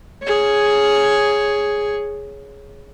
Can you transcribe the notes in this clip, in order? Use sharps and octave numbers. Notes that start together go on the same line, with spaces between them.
G#4 C#5